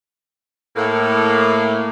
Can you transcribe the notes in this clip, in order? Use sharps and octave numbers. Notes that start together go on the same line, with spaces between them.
A2 A#3